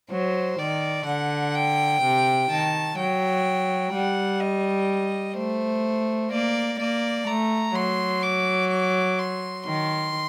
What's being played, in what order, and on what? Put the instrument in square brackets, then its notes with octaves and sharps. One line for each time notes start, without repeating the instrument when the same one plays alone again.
[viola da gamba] F#3 [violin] C5
[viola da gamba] D#3 [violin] D5
[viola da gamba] D3 [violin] F#5
[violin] G5
[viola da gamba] C3
[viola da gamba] D#3 [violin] A5
[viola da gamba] F#3 [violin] G5
[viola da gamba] G3 [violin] F#5
[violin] D#5
[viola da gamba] A3 [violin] C5
[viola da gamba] A#3 [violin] D5
[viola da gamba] A#3 [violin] D5
[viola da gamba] A3 [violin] A#5
[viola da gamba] F#3 [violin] C6
[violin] D6
D6
C6
[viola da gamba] D#3 [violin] C6